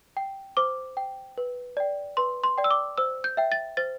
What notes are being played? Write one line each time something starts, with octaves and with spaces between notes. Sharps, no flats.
G5
C5 D6
G5
B4
D5 G5
B4 C6
C6
D5 G5
E6
D6
C5 E6
G6
E5 G5
A6
C5 A6